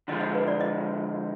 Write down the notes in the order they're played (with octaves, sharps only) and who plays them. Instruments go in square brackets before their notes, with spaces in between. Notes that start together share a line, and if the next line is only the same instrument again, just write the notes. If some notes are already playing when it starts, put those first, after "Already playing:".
[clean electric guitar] D3 F3 G#3 [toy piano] D#5
[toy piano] D#5
B4
D5
D#5